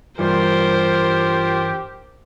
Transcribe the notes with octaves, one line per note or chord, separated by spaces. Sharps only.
G2 E3 G3 F4 G4 A#4 C5